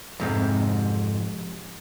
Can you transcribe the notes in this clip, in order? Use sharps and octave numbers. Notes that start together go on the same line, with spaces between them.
F2 G#2 C3